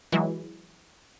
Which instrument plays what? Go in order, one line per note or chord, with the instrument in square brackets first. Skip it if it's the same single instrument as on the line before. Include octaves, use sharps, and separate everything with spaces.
[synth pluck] E3 F#3 G#3 E4